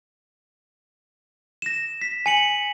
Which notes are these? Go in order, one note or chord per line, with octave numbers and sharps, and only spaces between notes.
A#6 E7
B6
G#5 C#7 F#7